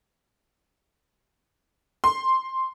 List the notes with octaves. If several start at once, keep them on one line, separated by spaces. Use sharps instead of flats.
C6